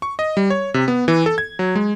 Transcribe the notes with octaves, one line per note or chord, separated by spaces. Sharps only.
C#6
D#5
G3
C#5
C3
B3
E3
A4
G#6
F#3
G#3